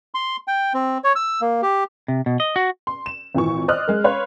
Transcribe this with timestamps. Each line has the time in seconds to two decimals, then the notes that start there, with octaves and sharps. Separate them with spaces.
0.14 C6
0.48 G5
0.74 C4
1.04 C#5
1.15 E6
1.41 A#3
1.62 G4
2.08 C3
2.26 B2
2.40 D#5
2.56 F#4
2.87 C6
3.06 E7
3.35 G#1 A#2 E3 C#6
3.68 C5 D5 D#5 D#6 F6 F#6
3.88 G#3 A#4
4.04 B4 C#5 F5 C6 F#6